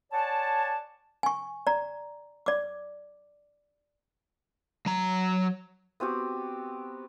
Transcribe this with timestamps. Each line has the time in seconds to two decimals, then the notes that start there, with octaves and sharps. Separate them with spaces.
0.13 C#5 D5 F#5 G#5 A5
1.23 G#5 C#6
1.67 D5 A#5
2.46 D5 D6
4.86 F#3 A#5
6.00 B3 C4 F#4 G4